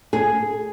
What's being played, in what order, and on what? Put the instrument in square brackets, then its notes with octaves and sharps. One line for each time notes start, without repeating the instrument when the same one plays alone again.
[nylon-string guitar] G#4